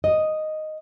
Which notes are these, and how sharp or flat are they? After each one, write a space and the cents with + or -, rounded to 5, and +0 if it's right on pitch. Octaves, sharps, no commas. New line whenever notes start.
D#5 -5